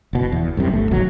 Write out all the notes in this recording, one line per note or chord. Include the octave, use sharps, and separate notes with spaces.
F#1 B2
E2
C2 F#2 C3
G1 A3
D1 G#1 B2 F#3